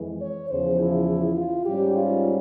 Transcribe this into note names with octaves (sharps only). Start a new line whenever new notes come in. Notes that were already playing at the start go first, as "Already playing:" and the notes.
Already playing: F2 E3 G#3
C#5
E2 C#3 F3 C5
E4
F4
G#2 G3 C#4 G4
F4